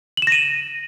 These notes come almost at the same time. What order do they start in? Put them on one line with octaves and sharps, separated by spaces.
F#7 E7 A#6 D#7